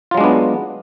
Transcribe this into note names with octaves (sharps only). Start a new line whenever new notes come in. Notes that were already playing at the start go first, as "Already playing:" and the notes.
F#3 G#3 B3 D4 F4